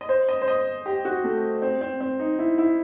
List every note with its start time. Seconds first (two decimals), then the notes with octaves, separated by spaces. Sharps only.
0.01 D#5
0.09 C5
0.29 D#5
0.42 C5
0.48 D#5
0.86 G4
1.05 F#4
1.24 A3
1.62 C4
1.81 C4
2.00 C4
2.20 D#4
2.39 E4
2.58 E4